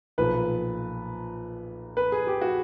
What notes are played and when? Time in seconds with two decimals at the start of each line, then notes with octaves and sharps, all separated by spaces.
0.18 B1 A#2 F3 B4
1.97 B4
2.12 G#4
2.27 G4
2.41 F#4